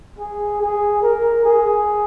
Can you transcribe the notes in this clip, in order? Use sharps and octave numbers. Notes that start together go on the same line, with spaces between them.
G#4
G#4
A#4
G#4